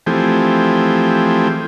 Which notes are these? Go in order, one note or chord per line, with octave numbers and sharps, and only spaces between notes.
E3 F3 A3 C4 G4 G#4